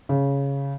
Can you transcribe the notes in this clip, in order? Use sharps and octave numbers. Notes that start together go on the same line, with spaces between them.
C#3